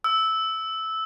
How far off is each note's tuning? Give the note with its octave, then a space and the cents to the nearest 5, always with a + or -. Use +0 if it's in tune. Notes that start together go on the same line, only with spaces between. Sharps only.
E6 -10